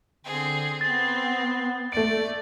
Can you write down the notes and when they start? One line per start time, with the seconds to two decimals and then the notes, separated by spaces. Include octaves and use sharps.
0.25 D3 C4 G#4
0.81 B3 C4 A6
1.92 A3 D5 D7